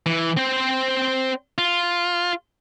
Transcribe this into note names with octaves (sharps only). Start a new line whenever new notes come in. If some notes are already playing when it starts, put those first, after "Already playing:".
E3
C4 C5
F4